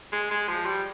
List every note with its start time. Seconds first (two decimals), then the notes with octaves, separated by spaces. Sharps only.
0.13 G#3
0.31 G#3
0.48 F3
0.66 G3